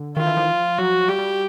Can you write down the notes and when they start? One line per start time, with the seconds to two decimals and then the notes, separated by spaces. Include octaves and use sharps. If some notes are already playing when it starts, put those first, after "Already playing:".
Already playing: D3
0.17 D#3 F4
0.27 E3
0.37 F3
0.78 F#3 F#4
1.08 G3 G4
1.18 G3